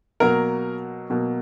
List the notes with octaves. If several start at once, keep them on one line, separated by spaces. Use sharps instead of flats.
B2 F#3 A#3 A#4 A#5
B2 F#3 A#3